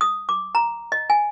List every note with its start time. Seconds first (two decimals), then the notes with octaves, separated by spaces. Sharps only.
0.01 D#6
0.29 D6
0.55 A#5
0.92 D#5
1.10 G#5